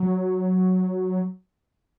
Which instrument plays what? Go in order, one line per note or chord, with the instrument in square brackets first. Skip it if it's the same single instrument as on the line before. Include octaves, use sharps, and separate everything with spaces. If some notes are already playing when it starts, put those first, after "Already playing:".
Already playing: [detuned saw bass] F#3